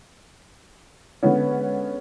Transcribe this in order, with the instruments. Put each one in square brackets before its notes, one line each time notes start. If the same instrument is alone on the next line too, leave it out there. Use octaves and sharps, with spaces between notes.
[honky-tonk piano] D3 G#3 B3 C#4